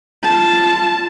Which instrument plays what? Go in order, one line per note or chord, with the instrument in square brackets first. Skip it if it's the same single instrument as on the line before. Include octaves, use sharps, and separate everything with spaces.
[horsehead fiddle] F4 A5